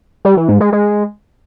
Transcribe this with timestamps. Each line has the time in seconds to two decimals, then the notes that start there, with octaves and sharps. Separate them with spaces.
0.25 G3
0.37 E3
0.49 G#2
0.60 G#3
0.72 G#3